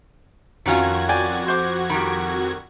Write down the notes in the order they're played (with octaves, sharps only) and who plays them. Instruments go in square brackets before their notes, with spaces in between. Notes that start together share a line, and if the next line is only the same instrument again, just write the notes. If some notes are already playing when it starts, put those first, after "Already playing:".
[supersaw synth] F2 F#4 G#6 [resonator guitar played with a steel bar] D#3 C#4 F4
[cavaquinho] D5 G5 G#5
C5 D6
[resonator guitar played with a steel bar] D#3 G3 [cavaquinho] B5